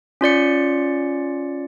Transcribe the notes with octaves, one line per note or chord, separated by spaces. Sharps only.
C#4 F4 D5 C#7